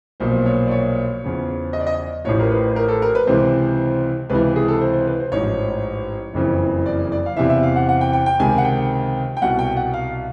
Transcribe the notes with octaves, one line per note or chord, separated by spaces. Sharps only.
B1 A#2 F3 C5
C#5
D5
C#5
E2 C#3 F3
D#5
D5
D#5
A1 A2 F3 C#5
A#4
B4
A#4
A4
A#4
B4
C#2 C3 E3 C5
C#2 C3 E3 B4
G#4
A4
C5
C5
B4
C5
A1 G#2 F3 C#5
F#1 F2 C#3 E3
D5
D5
F5
E2 C3 E3 E5
E5
F5
F#5
F#5
G5
G5
G5
C#2 C3 D#3 G#5
F#5
G5
G5
C2 B2 F#5
G5
F#5
F5